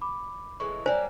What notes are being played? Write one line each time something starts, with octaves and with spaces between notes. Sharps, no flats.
B5 D6
A2 E3 G#3 C#6
F#3 G3 A#3 C5 D5 G#5